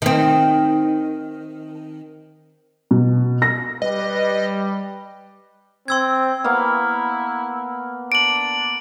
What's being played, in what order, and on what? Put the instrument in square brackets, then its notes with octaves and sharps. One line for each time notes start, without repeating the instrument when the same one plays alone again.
[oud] D#3 C4
[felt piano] B2
A#6
[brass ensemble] G3 [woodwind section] B4 [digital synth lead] D#5
[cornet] C4 [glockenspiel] C6 E6 G#6
[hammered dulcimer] A#3 B3 F5 [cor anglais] E4
[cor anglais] D4 [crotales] D7 F#7